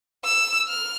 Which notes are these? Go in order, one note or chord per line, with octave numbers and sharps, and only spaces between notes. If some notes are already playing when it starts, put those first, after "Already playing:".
E6
F6